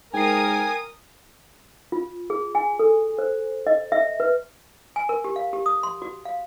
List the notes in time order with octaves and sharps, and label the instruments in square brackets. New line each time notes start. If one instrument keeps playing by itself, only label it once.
[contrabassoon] G#2 [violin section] A#4 D#6 [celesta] G5 C7 [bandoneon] G#5
[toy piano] F4
G#4
G#5
A4
C5
D#5
E5
B4
G#5
A#4
G4
F5
G4
D#6
C6
F#4
F5